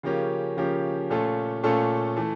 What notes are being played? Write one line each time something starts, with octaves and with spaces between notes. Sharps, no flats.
C#3 F3 A#3 C#4 G4
C#3 F3 A#3 C#4 G4
A#2 A3 C#4 F4 A4
A#2 A3 C#4 F4 A4
E3 A3